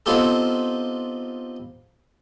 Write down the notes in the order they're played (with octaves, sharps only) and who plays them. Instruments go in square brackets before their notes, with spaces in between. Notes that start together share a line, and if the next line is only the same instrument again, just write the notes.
[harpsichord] B3 C4 D#4 F4 G4 A4